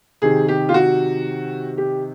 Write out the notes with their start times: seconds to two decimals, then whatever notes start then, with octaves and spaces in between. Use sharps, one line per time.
0.22 C3 D#3 G#4
0.48 G4
0.69 F4
0.74 F#4
1.78 G4